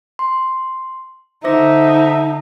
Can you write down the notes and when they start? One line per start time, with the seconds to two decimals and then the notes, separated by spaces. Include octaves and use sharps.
0.19 C6
1.44 D3 D#4 C5 E5 D6 A#6